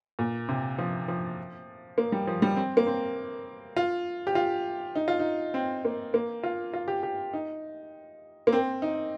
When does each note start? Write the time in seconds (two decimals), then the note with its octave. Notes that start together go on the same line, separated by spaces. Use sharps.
0.19 A#2
0.49 C3
0.78 F3
1.08 F3
1.98 A#3
2.12 G3
2.27 F3
2.42 G3
2.56 C4
2.77 A#3
2.87 C4
3.76 F4
4.27 G4
4.35 F4
4.96 D#4
5.08 F4
5.20 D#4
5.54 C4
5.85 A#3
6.14 A#3
6.43 F4
6.74 F4
6.88 G4
7.03 G4
7.33 D#4
8.47 A#3
8.52 C4
8.82 D#4